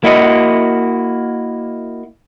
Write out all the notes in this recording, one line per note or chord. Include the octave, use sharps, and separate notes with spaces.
A#3 E4 F#4 D#5